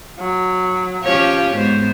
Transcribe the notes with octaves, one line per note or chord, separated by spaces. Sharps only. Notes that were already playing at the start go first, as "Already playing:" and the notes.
F#3
F3 C#4 G4 C#5
G#2 B3 C5